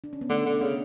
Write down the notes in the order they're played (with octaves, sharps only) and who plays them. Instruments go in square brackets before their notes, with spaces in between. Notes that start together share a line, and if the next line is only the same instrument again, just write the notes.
[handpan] D4
C#4
B3
[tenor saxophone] D3 [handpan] A3
[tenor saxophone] D3
[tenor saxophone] C#3 [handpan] C#4